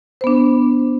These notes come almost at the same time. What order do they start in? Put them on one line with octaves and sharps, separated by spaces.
C5 B3 D4